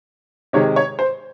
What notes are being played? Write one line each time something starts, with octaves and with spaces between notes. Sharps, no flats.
C3 D#3 G#3 C#5
C#5
C5